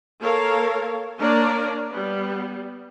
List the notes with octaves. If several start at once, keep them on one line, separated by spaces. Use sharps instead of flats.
A#3 A4 A#4 C#5 F5
A#3 D4 A#4 C#5 D5 A#5
G3 B3